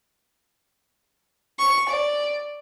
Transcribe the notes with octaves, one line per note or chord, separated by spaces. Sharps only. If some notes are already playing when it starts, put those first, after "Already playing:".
C#6
D5